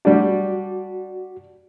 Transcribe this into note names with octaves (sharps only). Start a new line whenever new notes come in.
G3 D4 F#4